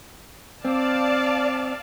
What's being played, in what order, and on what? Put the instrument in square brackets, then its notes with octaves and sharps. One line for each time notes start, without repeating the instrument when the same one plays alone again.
[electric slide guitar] C4 [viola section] D5 F5 A5